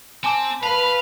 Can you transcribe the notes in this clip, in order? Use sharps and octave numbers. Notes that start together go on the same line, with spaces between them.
C4 G#5 A5 D6
B4 F5 A5 B5